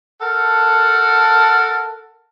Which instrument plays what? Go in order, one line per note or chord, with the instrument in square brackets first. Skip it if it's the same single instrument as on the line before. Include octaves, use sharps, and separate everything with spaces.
[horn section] A4 A#4 F#5 A5